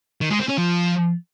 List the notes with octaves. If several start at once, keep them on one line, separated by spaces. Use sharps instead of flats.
D#3
G#3
C4
C#4
F3